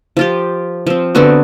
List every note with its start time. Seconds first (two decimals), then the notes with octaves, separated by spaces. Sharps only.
0.17 F3 F4 G4
0.87 F3 C4
1.15 D3 B3 C4 F#4